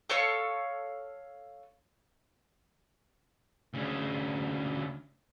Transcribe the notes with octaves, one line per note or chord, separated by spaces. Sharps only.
A4 C#5 F5 C#6
D2 C#3